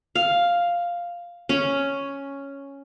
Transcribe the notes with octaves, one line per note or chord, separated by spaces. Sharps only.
F5
C#4